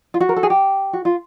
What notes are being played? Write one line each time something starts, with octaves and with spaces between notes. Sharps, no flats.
F4
F#4
A#4
A4
G#4
G4
F#4
F4